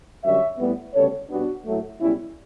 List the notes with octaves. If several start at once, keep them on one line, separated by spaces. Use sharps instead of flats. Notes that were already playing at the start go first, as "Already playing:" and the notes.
F#2 D3 G3 C#5 E5
A2 G3 B3
D2 C#3 G3 B3 A4 C#5
B2 G3 B3 D4 F#4
A2 F#3 A3
C#2 B2 G3 C#4 E4